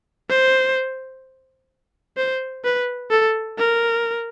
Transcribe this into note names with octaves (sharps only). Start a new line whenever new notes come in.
C5
C5
B4
A4
A#4